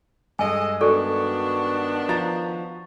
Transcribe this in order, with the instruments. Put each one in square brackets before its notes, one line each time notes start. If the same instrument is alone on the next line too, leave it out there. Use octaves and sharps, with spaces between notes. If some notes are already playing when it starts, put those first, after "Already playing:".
[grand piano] G2 G#3 [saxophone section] A4 D#5 [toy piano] G#5
[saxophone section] D#3 B3 D4 [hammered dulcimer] F#4 [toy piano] A4 D5
[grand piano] F3 A#5 A6